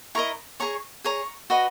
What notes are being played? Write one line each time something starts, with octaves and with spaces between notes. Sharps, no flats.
E4 A#4 D#5 A#5 C#6
G#4 C#5 A#5 C#6
G#4 C#5 A#5 C#6
F#4 B4 D#5